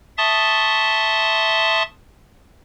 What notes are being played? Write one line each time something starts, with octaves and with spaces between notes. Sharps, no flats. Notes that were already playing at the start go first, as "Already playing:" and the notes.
E5 A5 C6 C#6 D#6 A6